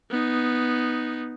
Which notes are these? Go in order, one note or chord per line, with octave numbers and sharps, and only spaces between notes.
B3 D#4